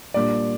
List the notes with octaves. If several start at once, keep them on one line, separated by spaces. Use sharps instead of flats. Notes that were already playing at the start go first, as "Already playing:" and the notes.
A#2 G3 D4 D5